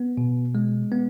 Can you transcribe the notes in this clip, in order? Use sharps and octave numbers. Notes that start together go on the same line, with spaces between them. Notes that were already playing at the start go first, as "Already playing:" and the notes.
Already playing: B3
B2
G#3
B3